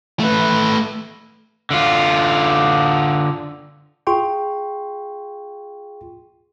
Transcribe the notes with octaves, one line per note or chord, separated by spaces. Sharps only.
A3 B4
D3 F4
F4 G#4 G5 C6 C#6